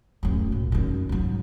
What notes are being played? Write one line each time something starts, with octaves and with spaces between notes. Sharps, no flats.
D1 F#2
A#2
F#2 D#3
G#2 F#3